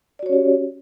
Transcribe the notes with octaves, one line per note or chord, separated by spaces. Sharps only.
C#4 F#4 G4 C#5 D5